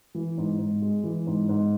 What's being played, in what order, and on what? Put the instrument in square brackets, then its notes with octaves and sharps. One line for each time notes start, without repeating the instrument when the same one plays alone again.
[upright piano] E3
G#2
G#2
G#3
E3
G#2
G#2